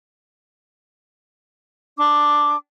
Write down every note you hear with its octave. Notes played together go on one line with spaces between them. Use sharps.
D4 D6